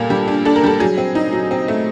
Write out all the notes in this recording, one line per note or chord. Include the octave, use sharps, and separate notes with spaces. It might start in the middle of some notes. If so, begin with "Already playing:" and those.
Already playing: A#2 G3 A#3 A4
G3
D4
D4 A4
A#4
G3 A4
F#3 G#4
C4
D#4
F#3
C4
A3